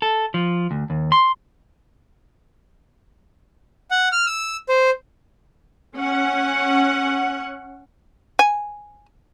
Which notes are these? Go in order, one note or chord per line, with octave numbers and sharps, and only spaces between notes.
A4
F3
D2
D#2
C6
F#5
F6
E6
C5
C#4 F#5
G#5